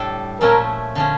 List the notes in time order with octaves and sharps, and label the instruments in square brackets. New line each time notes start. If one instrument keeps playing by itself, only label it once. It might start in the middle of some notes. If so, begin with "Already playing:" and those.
Already playing: [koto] A2 G3 D4 A4
[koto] A#2 F3 A3 C#4 E4 [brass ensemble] A#4
[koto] D3 F3 C#4